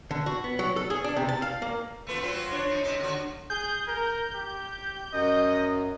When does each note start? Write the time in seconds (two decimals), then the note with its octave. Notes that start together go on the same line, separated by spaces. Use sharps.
0.11 D3
0.26 F#4
0.44 B3
0.59 F#3
0.76 A4
0.90 G#4
1.04 D4
1.16 C3
1.29 A5
1.42 F5
1.62 A#3
2.07 A3 B3 F4
2.20 F#3 C4 F4
2.51 D4 C#5
2.68 F3 D#4
2.83 C3 D#4
3.00 D3 F#4
3.50 G#4 G6
3.88 A#4
4.35 G4
5.13 F#2 D#5